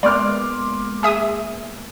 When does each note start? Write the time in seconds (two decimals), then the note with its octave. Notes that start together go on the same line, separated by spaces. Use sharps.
0.03 G#3 A#3 B3 D5 C6 D6 F6
1.03 G#4 E5 D#6